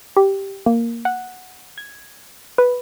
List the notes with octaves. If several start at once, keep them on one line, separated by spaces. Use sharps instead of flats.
G4
A#3
F#5
G#6
B4